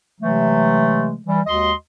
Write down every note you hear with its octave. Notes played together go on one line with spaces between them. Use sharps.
C3 E3 F#3 G#3 A3
E3 G3
D#2 G#3 F#4 D#5 C6